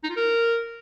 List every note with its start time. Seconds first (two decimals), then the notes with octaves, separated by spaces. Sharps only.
0.04 D#4
0.10 F4
0.16 A#4